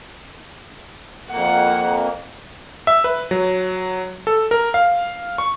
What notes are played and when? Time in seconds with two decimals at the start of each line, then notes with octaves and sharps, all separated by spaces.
1.31 F2 A#3 F#5
2.87 E5
3.04 B4
3.31 F#3
4.27 A4
4.51 A#4
4.74 F5
5.38 C#6